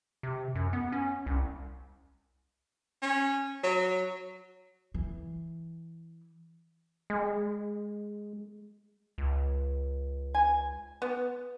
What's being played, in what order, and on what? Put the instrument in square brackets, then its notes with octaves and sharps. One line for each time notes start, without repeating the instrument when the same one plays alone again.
[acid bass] C3
F#2
B3
C#4
C2
[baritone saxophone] C#4
F#3
[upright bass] E3
[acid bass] G#3
C#2
[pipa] G#5
B3